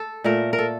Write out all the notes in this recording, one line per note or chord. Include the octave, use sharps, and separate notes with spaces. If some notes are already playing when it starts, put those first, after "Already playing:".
Already playing: A4
A#2 A3 A#4
A#4
A4